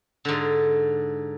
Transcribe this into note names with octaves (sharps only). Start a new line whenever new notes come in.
G#2 D3